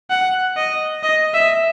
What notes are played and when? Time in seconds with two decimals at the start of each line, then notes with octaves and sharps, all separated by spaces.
0.10 F#5
0.57 D#5
1.03 D#5
1.34 E5